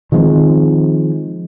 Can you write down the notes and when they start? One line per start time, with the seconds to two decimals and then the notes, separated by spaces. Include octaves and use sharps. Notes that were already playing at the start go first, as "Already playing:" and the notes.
0.12 D#3 F3 G#3 C4